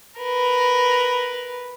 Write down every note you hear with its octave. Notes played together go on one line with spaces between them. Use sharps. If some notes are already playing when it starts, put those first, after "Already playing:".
A#4 B4